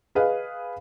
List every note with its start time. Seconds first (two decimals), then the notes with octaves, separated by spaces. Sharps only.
0.15 G#4 B4 D#5 F5